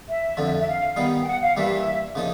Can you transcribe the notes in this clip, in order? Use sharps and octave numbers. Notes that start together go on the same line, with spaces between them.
E5
F2 D3 F3
E5
F5
D#3 G3 B3 D#4
G5
F#5
F5
G2 E3 G3 A#3 D4 E5
C#3 F3 A#3 D#4